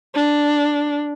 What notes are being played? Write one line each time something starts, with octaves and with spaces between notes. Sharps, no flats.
D4